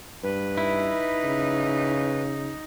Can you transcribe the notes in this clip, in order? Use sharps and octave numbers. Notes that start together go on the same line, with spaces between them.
G2 B4
D#4 E4
C#3